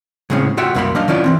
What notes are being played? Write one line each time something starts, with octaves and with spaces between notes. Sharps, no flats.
A2 C#3 G#3 C4 C#4
A3 F4 F#4 C#5 E5 G5
C2 F#2 A#3 F5 B5 C6
F#3 D4 D#5 F5
D#3 C#4 E4 F4 D5
E3 F#3 C4